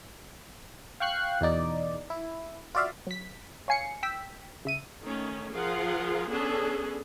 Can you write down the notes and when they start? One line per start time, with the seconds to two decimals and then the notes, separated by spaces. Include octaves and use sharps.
1.00 F5 G5 C#6 F#6 C7
1.41 E2 B2 D#4 D5
2.10 E4
2.75 F4 F#4 D5 E5 F5
3.07 F#3 B6
3.68 C#5 F5 G#5 C7 C#7
4.03 G5 E6 B6
4.65 C#3 E5 D#7
5.02 D#3 A3 C#4
5.52 F3 F4 G#4 A#4 F5 F#5
6.30 B3 C#4 D4 G#4 A4